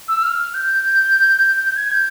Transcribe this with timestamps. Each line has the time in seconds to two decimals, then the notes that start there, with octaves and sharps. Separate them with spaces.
0.08 E6
0.23 F6
0.54 G6
1.76 G#6
1.92 G6